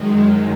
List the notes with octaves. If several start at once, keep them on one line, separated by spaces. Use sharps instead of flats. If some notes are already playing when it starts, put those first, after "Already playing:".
Already playing: F#2 D#3 G#3